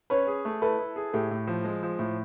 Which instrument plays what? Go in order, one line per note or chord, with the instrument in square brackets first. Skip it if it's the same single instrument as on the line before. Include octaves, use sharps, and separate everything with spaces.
[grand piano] C#4 [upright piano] B4 C#5
[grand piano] G#4
A3
[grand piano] E4 [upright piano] A4 B4
[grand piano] E4
G#4
[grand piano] A2 [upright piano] G4 A4
[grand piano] A2
F3
G#3
F3
A2